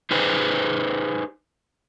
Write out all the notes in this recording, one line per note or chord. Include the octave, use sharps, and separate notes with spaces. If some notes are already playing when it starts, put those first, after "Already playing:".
D#4 G4 G#4 B4 C5